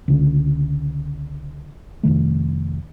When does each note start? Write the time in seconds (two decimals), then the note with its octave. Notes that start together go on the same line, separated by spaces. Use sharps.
0.08 C#2 D3
2.03 F1 C#2 D#3 A3